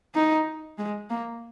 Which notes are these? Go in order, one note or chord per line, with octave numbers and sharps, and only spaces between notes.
D#4
G#3
A#3